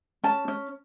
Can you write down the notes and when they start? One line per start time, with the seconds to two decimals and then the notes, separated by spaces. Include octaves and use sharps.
0.24 C#4 A5
0.48 C#4